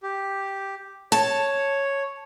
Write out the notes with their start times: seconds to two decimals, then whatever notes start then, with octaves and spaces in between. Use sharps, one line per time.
0.03 G4
1.12 C#5 A5